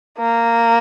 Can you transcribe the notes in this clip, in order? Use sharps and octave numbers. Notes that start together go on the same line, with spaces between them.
A#3